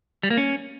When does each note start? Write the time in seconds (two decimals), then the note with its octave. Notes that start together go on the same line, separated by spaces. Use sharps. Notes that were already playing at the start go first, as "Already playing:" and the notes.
0.23 G3
0.30 A#3
0.37 C#4